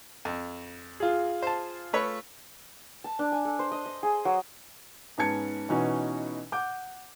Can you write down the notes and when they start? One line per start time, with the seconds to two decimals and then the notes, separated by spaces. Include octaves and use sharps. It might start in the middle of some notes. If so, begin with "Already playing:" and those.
0.25 F2
1.00 F4 G#4
1.42 C5 A5
1.93 A3 B4 C#5
3.04 A5
3.19 D4
3.32 G#5
3.45 A4
3.59 C5
3.71 D#5
3.86 D#5
4.03 G#4
4.25 F#3
5.18 G#2 B3 C#4 A5 G#6 C#7
5.69 B2 E3 C#4 D#4 F#4
6.52 F#5 D6 G6